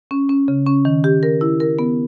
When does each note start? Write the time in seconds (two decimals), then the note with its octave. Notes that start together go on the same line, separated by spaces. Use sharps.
0.11 C#4
0.29 C#4
0.48 C#3
0.66 C#4
0.85 D#3
1.04 G4
1.23 A#4
1.41 E4
1.60 A#4
1.79 B3